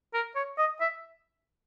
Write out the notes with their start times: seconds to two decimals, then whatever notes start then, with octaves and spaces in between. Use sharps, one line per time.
0.14 A#4
0.35 C#5
0.58 D#5
0.81 E5